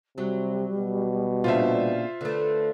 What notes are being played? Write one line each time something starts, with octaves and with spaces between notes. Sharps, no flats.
C3 F#3 G3
B2
A#2 C#3 D4 F4 C5 E5
D3 A3 B4